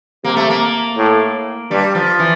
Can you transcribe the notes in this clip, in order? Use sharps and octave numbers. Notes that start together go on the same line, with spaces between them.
C3 A#3
A3
A#3
A2
G2 G3
F3
E3